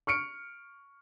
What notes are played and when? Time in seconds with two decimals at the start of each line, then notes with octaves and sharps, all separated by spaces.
0.07 C#6 F6 C#7 D7